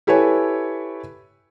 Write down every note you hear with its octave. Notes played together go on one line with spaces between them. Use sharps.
E4 G4 A4 B4 C#5 G#5